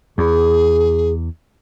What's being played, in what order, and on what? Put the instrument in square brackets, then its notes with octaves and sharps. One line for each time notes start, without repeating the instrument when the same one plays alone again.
[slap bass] E2 [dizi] G#4